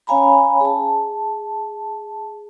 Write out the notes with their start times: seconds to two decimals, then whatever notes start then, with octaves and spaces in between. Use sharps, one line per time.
0.07 C#4 C#5 F5 G#5 A#5 B5
0.61 G#4 A5